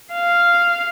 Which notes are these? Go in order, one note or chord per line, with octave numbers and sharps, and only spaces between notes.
F5